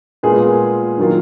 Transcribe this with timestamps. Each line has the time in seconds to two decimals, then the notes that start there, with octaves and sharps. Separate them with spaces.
0.23 A#2 G#3 B3 F4 G#4
0.98 D#3 F#3 A#3 F4